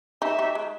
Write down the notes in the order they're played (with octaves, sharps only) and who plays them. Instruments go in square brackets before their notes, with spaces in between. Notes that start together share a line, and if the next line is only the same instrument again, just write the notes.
[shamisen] D#4 G4 [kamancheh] E5
[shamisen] D#4 G4
G#3